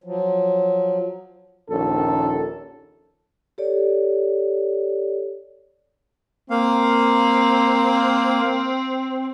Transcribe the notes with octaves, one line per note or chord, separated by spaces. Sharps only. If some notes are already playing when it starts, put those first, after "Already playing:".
F3 F#3
A#1 D#2 C#4 A4
G4 A4 C#5 D5
A#3 C4 F5